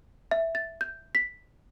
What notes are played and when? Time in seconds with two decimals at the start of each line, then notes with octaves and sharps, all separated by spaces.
0.31 E5
0.55 A6
0.81 G6
1.15 B6